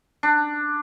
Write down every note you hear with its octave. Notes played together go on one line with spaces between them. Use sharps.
D4